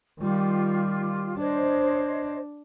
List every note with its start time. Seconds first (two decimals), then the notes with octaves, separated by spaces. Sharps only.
0.20 D#3 G3 F4 G4
1.38 D4 C5 C#5 D#5